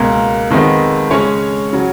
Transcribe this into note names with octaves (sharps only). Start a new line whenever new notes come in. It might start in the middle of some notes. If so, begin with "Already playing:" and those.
Already playing: C#2 B2 A#3 A#4
F2 D#3 G#3 B3 D#4
C#3 G#3 C#4 C#5
C#3 F#3